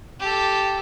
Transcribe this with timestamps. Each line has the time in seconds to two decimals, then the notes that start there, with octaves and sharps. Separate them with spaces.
0.20 G4 A4